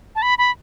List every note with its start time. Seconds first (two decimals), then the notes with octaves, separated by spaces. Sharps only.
0.16 A5
0.22 B5
0.38 B5